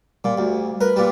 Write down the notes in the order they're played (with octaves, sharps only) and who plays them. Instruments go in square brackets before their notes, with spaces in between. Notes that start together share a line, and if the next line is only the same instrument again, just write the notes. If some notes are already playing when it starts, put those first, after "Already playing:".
[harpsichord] A#2 [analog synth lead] G3
[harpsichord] D2
[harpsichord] A#4 [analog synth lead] B4
[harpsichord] A#2 G3